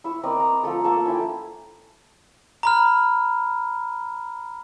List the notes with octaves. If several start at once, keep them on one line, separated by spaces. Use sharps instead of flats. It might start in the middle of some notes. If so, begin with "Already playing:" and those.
E4 C#6 E6
C4 A#4 D5 D#5
A#5
F3 A3 A4 D6
A#3 A4 A5 C#6
C#4 E4 E5 G5
A#5 B5 F6